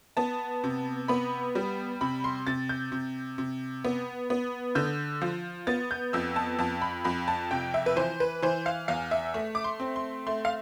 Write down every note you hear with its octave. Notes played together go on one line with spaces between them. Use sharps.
B3 A5
C3
B3 B5
G3
C3 B5
C6
C3 A6
G6
C3
C3
B3
B3
D3 G6
F3
B3 A6
G6
F2 E6
A5
F2 A5
B5
F2 B5
A5
C3 G5
E5
B4
E3 C5
B4
E3 C5
F5
E2 F5
E5
A3
D6
C6
C4
C6
A3 C6
F5